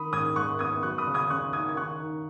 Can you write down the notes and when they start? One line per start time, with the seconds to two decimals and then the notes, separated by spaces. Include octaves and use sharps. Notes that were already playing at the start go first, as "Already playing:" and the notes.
Already playing: D#3 B5 D#6
0.13 G#2 D#6 G#6
0.36 G#2 C#6 F#6
0.59 B3 D#6 G#6
0.83 F#3 C#6 F#6
0.98 B5 D#6
1.07 C#3
1.14 D#6 G#6
1.30 C#3 C#6 F#6
1.53 D#4 D#6 G#6
1.69 G#6
1.77 D#3 C#6 F#6
2.00 D#4